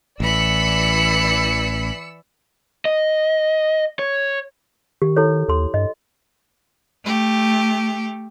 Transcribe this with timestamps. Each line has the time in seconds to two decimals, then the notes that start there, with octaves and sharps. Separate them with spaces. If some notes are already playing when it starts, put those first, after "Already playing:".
0.20 A1 E3 D5 B5 E6 C#7
2.85 D#5
3.99 C#5
5.02 D#3 G4
5.16 E4 A4 C#5
5.48 D#2 A4 C6
5.74 G2 D#5
7.03 A3 G4